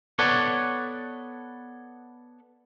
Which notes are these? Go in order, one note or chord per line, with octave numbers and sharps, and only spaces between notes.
B3 A4 B4 C#5 D5 F#5